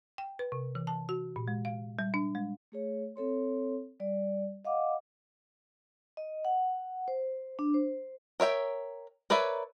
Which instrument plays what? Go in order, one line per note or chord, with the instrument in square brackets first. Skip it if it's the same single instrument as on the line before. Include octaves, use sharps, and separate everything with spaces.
[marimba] G5
B4
C3
E3
A5
F#4
A#2
G#3
F5
G3
D4
G#3
[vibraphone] A3 G#4 C#5
C4 A4 C#5 C6
G3 D5
D#5 F5 F#5 D6
D#5
F#5
C5
D4
C5
[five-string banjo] A#4 C#5 E5 G5
A#4 B4 C#5 D5 E5